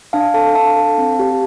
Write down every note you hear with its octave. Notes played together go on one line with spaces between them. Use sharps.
D4 F5 A5
A4 F5 A5
D4 F5 A5
A4
C4
G4